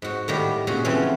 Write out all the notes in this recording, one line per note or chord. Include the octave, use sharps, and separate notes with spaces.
G#2 F#4
A2 D#3 G3
A#2 C#3 F#4 G#4
C#3 E3 F3 A3 C4 C#4